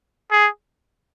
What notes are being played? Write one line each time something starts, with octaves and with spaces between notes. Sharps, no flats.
G#4